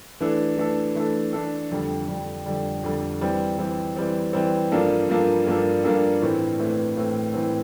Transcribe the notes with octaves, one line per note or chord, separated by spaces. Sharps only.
E3 A3 D4 A4
E3 A3 D4 A4
E3 A3 D4 A4
E3 A3 D4 A4
F2 D3 G3
F2 D3 G3
F2 D3 G3
F2 D3 G3
E3 G3 C4
E3 G3 C4
E3 G3 C4
E3 G3 C4
G2 F3 A#3 D4 A4
G2 F3 A#3 D4 A4
G2 F3 A#3 D4 A4
G2 F3 A#3 D4 A4
A2 E3 A3 C4
A2 E3 A3 C4
A2 E3 A3 C4
A2 E3 A3 C4